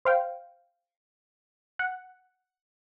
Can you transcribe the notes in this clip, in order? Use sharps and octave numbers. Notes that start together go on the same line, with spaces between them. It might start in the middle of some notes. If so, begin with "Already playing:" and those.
C5 F5 G5
F#5